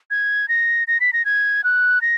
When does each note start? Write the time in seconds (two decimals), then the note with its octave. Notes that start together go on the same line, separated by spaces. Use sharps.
0.11 G#6
0.48 A#6
0.87 A#6
1.00 B6
1.13 A#6
1.25 G#6
1.64 F#6
2.01 A#6